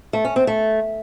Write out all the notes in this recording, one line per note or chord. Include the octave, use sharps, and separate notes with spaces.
A3
C#4
C4
A3